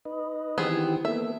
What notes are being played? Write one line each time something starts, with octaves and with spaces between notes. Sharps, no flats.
D#4 B4 D#5
D#3 E3 B3 C4 G4 G#4
A#3 B3 A4 E5